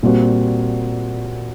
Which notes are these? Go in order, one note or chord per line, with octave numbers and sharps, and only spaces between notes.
A#2 G3 C4 F#4